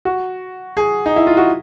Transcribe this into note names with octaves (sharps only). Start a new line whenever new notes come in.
F#4
G#4
D#4
E4
F4
F#4